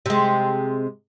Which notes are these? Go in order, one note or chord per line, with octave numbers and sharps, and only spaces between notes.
C3 G#3